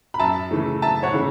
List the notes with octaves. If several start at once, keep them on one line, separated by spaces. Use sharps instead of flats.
B5
F#2 E5 A5
C#3 E3 A3
F#2 E5 A5
C#5 F#5
C#3 E3 A3